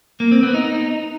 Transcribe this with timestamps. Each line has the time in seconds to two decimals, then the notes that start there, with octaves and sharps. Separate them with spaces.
0.20 A#3
0.31 C4
0.43 B3
0.54 D#4